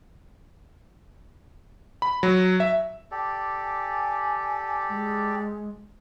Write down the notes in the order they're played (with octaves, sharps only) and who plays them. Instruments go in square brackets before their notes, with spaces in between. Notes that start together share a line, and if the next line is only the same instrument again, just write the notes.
[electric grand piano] B5
F#3
E5
[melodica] G4 A4 D5
[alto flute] G#5
G#3